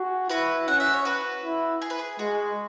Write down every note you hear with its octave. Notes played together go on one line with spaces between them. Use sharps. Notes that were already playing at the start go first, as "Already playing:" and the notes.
Already playing: F#4 G#4
E4 F#4 B4
C#4 F#5
E5
C#5
F#4 B4
E4
G#4
B4
G#4
G#3 F#4